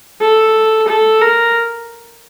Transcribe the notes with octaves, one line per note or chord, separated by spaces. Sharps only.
A4
A4
A#4